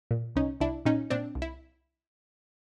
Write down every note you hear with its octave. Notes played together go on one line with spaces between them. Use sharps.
A#2
C2 C#4 D#4
C2 D4 E4
A#2 C#4 D#4
A#2 C4 D4
C2
E4